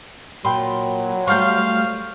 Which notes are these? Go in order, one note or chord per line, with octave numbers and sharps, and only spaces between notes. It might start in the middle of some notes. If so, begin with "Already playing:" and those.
A#2 F#3 G5 B5 C6
G3 A3 C5 F5 C#6 F6 G6